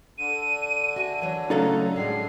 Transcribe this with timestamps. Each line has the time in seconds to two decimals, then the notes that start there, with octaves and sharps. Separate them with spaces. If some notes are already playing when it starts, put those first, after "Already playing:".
0.18 D3 D#7
0.96 F#4 E5 G#5
1.22 E3 F#3 C#5
1.50 C#3 F#3 A3 D#4 A4 F5 A#5
1.96 A2 G3 G#3 C7